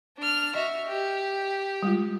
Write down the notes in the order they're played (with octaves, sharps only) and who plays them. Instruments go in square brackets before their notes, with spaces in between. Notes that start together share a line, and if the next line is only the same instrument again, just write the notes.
[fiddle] D4 F6
[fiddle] F#4 E5 [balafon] D#5
[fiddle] G4
[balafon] G3 G#3 F4